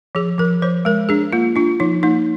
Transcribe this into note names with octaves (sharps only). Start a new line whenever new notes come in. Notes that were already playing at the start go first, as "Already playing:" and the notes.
F3 G#4
F3 A#4
F3 C5
G#3 A#4
D4 G#4
A#3 F4
D4 F4
F3 D#4
A#3 D#4